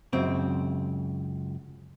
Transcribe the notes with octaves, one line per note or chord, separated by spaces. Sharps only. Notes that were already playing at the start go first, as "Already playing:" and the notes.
C#2 F#2 C#3 C4